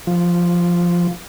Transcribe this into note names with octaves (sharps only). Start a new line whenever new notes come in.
F3